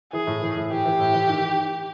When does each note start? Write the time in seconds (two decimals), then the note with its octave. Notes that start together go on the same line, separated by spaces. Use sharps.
0.13 E3 G#4
0.27 A2
0.42 E3
0.57 A2
0.71 E3 G4
0.86 E3
1.00 A2
1.14 E3
1.29 D#3